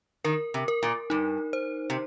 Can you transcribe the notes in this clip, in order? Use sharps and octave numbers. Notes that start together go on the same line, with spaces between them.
D#3 A#4
C3
A#4
A#2
G2 D#4
C5
C3